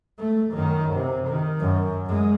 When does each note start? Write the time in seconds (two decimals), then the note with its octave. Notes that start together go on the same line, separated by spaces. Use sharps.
0.19 A3
0.51 F#2 D#3
0.95 C3
1.28 D#3
1.60 F#2
2.05 F#2 G#3